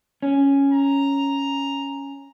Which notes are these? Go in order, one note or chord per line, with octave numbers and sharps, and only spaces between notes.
C#4
A#5